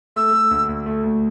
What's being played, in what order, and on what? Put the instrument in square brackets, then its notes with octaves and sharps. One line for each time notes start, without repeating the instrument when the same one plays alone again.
[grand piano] A3 [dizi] E6
[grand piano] A3
D2
D2
A3
D2